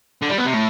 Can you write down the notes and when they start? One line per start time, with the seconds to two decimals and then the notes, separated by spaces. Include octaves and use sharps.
0.22 D3
0.29 G3
0.38 B3
0.46 C3
0.54 A2